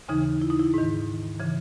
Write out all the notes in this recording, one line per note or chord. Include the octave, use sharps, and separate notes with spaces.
D#2 C#3 E3 D#4
E4
D#4
E4
G#2 D#3
C#3 E3